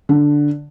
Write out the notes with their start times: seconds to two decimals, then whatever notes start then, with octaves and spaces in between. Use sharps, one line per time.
0.09 D3